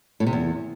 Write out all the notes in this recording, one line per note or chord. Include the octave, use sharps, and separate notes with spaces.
A2
C3
E2